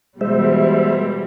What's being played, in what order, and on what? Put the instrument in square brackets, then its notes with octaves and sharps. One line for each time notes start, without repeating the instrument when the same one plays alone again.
[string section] B2 E3 G3 [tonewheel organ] G#3 C5 E5